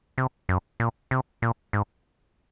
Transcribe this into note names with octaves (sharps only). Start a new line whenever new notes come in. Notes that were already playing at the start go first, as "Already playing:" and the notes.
C3
F#2
A#2
C3
A#2
G#2